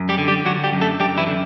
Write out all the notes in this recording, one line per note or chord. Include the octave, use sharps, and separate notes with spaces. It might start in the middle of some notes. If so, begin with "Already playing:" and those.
Already playing: F#2
G3 G4
D3
G3 G4
D3 F#3 F#4
G3 G4
F#2
A3 A4
F#2 G3 G4
E3 E4
D3